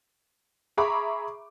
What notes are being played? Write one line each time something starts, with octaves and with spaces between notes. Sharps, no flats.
G#4 E5 A#5 B5 C#6 D6